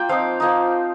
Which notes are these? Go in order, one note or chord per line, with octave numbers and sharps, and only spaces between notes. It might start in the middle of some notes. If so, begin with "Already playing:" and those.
Already playing: A#3 F4 G5
F3 C4 D#4 F5
F3 A#3 D#4